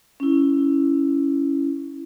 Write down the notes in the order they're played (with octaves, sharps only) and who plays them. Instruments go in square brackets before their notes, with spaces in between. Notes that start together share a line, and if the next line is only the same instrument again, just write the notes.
[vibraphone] C#4 E4